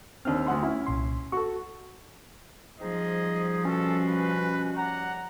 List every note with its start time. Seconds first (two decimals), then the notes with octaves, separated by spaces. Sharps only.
0.25 D#2 C4 D4 F6
0.46 D2 F#5 C6
0.62 C#4 E4
0.86 C2 A#2 C6
1.32 F#4 A4 C#6
2.80 F3 G3 C4 D#4 G#4 D#5
3.65 G2 B2 C#4 F#4 A4
4.07 B4
4.77 D#2 D5 F#5 A#5